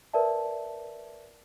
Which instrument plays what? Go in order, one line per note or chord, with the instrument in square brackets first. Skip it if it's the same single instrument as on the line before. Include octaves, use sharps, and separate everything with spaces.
[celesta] A#4 B4 D5 E5 A5